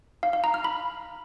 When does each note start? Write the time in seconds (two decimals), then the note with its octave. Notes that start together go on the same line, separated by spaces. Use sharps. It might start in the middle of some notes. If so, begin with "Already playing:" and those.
0.23 F5
0.33 F5
0.44 A#5
0.54 F6
0.64 B5